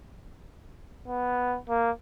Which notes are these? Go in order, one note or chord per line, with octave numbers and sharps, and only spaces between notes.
B3
A#3